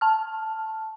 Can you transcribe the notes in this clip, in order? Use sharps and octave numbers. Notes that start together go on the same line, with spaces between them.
A5 F6